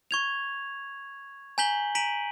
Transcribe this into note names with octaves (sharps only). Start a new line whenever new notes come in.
C#6 G#6 F7
G#5 A#5 G6 B6 F#7 G7
A#5 B6 D7 D#7 F#7